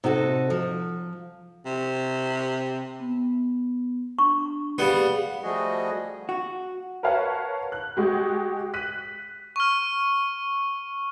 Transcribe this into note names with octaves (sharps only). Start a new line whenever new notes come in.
C3 D#4 F#4 A4
F3
C3
B3
D4 C#6
G3 B3 G#4 F5
F3 G3 A3 F#4 G#4 D#5
F#4
A#4 B4 C#5 F5 F#5 A5
F#6
G#3 F#4 G4
F#6 B6 D#7
C#6 F6